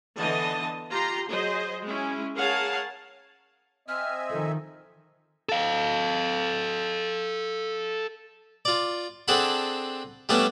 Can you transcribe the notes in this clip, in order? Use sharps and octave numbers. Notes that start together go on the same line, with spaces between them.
D3 E3 B3 D#5 A5
F4 G4 A#5 C6
F#3 G#4 C5 D#5
G#3 C#4 E4
G#4 A#4 C#5 F5 F#5 A5
C4 D#5 E5 G#5 F6
D#3 F3 A4
A4 F5
F4 D5
C4 D4 G#4 A4 F#5 B5
G3 A3 B3 C#4 D4 A4